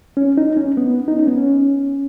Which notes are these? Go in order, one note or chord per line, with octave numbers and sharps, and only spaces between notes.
C#4
D#4
C#4
B3
D#4
C#4
B3
C#4